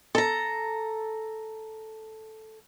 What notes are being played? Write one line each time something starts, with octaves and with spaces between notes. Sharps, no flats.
A4 A#5